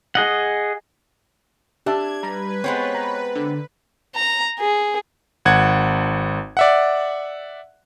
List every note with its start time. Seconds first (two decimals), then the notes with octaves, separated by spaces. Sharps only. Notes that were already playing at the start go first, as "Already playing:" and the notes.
0.15 G#4 D#5 F#5
1.86 D4 G4 E5 A5 G#6
2.23 G3 B4 A#5
2.64 G#3 B3 C4 C#5
2.95 A#5
3.35 D3
4.16 A#5
4.60 G#4
5.45 G#1 F#5 G#6
6.57 D5 E5 F#5